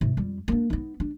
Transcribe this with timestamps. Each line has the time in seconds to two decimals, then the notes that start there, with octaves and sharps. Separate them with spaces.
0.01 G#2 C3
0.17 F2 G3
0.48 A#3 D4
0.70 B3 D#4
1.00 D4